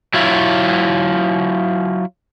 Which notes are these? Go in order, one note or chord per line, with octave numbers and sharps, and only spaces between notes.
F#3 E4 F4